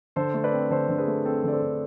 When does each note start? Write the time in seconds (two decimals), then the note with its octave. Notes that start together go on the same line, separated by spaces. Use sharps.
0.16 D3 A4 C5
0.34 A3
0.44 B4 D5
0.53 C4
0.70 D3 A4 C5
0.89 D3
0.98 G#4 B4
1.08 A3
1.25 C4 A4 C5
1.44 D3 D5
1.53 A4 C5
1.62 D3